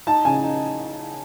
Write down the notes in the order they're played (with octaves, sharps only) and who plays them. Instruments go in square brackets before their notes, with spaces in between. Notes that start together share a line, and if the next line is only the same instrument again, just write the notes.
[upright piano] D#4 A5
C#3 G#5
D#4